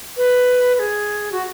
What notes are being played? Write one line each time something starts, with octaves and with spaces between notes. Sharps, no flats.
B4
B4
G#4
F#4